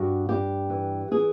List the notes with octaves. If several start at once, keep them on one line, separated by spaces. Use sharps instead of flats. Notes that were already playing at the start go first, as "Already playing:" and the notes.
Already playing: G2 F#4
G2 G4
E3
E3 G#4